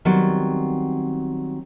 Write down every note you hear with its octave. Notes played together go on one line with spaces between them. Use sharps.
D#3 F#3 G3 B3 C4